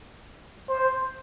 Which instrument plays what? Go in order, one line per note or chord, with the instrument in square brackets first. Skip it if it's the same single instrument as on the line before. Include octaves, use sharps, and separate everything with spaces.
[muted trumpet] C5